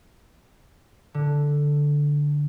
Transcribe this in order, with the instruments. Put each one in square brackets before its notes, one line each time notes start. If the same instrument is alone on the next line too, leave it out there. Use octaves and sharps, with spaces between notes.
[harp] D3